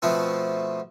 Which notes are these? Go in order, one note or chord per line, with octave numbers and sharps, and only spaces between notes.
B2 F3 A3 B3 C4